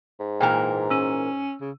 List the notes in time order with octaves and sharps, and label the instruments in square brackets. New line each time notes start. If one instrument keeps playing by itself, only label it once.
[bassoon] G#2
[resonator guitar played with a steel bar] A#2 E3 A#4 [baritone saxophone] A#3 [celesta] G5
[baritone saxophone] C#4 [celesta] E6 D#7
[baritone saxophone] C#3